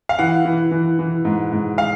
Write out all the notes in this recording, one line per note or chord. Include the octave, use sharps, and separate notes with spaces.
F5
E3 F#5
E3
E3
E3
G#2
G#2
F5